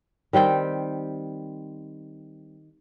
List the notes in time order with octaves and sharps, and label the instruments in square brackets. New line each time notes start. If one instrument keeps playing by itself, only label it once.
[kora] D#3 G3 C4 G5